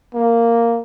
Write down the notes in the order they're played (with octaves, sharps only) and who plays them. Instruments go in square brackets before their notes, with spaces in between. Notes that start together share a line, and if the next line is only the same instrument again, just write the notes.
[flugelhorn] A#3